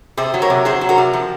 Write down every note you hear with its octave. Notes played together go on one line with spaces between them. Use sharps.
C3 G#4 C5
F#3
A#4 C#5
C3
F#3 G#4 C5
F#3
F#4 A#4
C3
F3